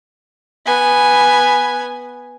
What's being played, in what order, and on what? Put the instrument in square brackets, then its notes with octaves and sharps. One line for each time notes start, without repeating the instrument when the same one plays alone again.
[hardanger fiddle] B3 G#5